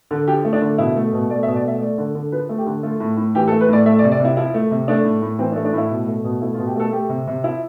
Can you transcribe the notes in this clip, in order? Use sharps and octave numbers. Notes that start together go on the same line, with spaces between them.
D3
F3 G4
A3
D4
D3
B2 E4
A3
B2
A3 D5
E5
B2
D5
A3 E5
A3 D5
D3
D3
F3 B4
A3
G4
D3
A3 F4
A2
A2
E3 G4
A4
A3
B4
A2 D5
A3 E5
D5
C3
D5
C3 E4
F3 E4
A3
C3
A3 D4
A2
A2
E3 C4
D4
A3
D4
A2 E4
B2
A3
B2
A3 E4
F4
B2
G4
A3 A4
A3 G4
C3
C3
F3 E4